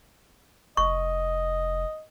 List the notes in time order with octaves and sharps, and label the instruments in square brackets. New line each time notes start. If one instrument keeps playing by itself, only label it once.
[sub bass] F1 [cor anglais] D#5 [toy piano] C#6